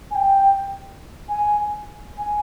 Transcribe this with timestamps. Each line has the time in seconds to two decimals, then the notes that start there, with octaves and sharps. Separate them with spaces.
0.11 G#5
0.15 G5
1.29 G#5
2.18 G#5